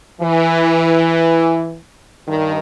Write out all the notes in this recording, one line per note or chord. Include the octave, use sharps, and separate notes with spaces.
E3
G2 D#3